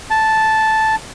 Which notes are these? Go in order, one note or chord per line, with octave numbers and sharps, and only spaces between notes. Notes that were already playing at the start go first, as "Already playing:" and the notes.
A5